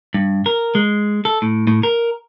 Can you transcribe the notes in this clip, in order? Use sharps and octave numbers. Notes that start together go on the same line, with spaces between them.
G2
A#4
G#3
A4
A2
A2
A#4